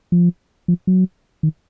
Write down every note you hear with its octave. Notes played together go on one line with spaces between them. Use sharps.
F3
F3
F#3
D#3